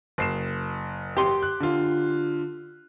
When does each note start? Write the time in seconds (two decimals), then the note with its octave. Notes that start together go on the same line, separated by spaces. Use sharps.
0.18 F#1 C7 E7
1.17 G4 C6
1.43 F#6
1.60 D3 F4